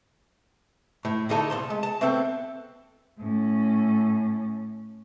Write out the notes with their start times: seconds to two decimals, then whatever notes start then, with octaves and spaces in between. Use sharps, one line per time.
1.05 A2
1.29 D2 A2 A#3 D#4 A4
1.50 C2 F3 A5 C6
1.70 G#3
1.83 A5
2.01 A3 B3 C4 A4
3.19 A2 C#4